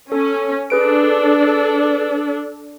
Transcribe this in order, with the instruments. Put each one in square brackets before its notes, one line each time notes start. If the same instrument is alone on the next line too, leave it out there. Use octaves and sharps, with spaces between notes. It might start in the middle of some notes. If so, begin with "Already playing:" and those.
[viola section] C#4 [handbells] A4
[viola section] D4 A4 [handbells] G#4 B4 D7